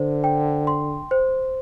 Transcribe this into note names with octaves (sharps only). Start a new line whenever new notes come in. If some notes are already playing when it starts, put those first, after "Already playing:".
Already playing: D3 C5
G5
C6
C5